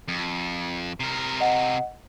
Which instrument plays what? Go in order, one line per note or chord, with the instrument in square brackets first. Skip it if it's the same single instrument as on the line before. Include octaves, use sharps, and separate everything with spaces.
[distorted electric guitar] F2
C3 A#4
[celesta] D#5 F#5